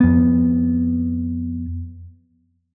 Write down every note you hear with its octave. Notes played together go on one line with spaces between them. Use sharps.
F2 B3